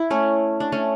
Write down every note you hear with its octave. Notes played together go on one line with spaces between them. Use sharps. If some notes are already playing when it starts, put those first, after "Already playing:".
Already playing: E4
A3 C#4
D4
A3 C#4